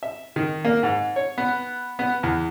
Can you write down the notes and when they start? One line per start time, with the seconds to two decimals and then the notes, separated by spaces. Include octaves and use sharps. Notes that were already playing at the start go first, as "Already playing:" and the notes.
0.03 E5
0.36 D#3
0.65 A#3
0.83 G#2
1.16 C#5
1.38 B3
1.99 B3
2.23 E2